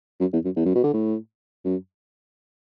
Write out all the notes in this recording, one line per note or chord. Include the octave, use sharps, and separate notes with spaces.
F#2
E2
F#2
E2
F#2
B2
D3
A2
F#2